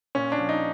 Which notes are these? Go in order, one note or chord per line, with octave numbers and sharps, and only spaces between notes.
A#2 C#4
D4
F3
D#4